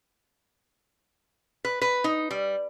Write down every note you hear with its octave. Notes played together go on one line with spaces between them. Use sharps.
B4
B4
D#4
G3